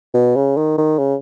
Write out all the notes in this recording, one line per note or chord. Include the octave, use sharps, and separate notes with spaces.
B2
C#3
D#3
D#3
C#3